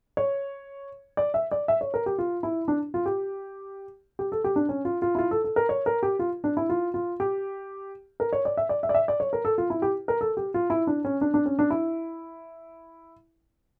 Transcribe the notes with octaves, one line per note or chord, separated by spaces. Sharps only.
C#5
D5
E5
D5
E5
C#5
A#4
G4
F4
E4
D4
F4
G4
G4
A4
G4
D4
C#4
F4
F4
E4
F4
A4
A4
A#4
C#5
A#4
G4
F4
D4
E4
F4
F4
G4
A#4
C#5
D5
E5
D5
E5
D5
E5
D5
C#5
A#4
A4
F4
E4
G4
A#4
A4
G4
F4
E4
D4
C#4
D4
D4
C#4
D4
E4